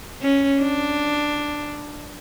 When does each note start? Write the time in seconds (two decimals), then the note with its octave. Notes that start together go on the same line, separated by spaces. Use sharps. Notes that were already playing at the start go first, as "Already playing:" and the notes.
0.22 C#4
0.60 D4